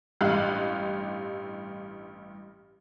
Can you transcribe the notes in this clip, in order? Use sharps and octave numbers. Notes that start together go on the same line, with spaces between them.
A1 G2 G4 F5 F#6